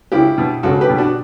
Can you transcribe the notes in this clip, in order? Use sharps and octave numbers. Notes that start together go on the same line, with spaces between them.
C#2 E4 G4
B2
C#2 F#4 A4
G4 B4
B2
D4 F#4